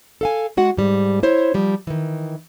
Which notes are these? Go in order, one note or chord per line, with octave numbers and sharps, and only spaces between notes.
A4 F5 G#5
G#3 F#4 F#5
G#2 G3
E4 C5 C#5
F3 G3
D#3 E3